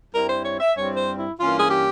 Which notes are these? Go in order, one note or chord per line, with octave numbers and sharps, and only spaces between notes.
G2 G3 C4 E4 A#4
C5
C#5
E5
G2 G3 C4 E4 C#5
C5
E4
G2 E3 A#3 C#4 F4
G#4
G4